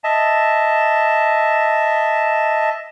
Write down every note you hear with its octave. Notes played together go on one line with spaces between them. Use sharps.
D#5 E5 A5